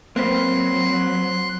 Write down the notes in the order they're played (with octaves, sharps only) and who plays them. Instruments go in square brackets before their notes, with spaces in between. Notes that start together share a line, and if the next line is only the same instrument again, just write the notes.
[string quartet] F#3 [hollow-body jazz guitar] A#3 C4 B4 [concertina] C6 F#6